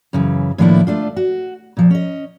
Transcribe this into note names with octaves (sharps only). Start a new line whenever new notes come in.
F#2 C#3 E3
A2 D#3 F3 A#3 D4 E4
A3 D4 F4
F#4
A#2 F3
C#4 D#5